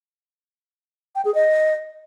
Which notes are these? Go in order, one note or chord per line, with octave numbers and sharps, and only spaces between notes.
G5
G#4
D#5